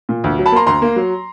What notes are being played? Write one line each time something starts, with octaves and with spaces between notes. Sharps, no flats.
A#2
D2
F#3
A5 B5
A#3 A#5 C6
D2 A#5 C6
A#3
F#3